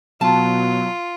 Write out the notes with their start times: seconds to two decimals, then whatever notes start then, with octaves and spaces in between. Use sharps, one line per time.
0.21 B2 F#3 F4 A5